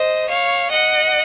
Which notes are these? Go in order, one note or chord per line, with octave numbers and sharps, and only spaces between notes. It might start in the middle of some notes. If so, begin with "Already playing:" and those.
Already playing: C5 D#5
C#5 F5
D#5 F#5